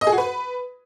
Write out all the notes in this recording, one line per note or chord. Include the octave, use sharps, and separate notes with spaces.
D#5
G#4
F#4
B4